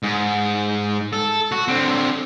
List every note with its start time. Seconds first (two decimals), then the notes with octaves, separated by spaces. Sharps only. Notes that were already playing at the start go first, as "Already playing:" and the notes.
0.03 G#2
1.13 A4
1.52 F#4
1.68 D3 C4